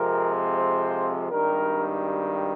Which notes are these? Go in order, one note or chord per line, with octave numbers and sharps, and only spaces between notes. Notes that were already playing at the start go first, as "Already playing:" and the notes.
Already playing: F2 C3 F3 G#3 C4 A#4
C5
G#1 G2 D#3 G3 A#4
G4